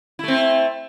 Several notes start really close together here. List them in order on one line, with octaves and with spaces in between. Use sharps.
E4 A3 C4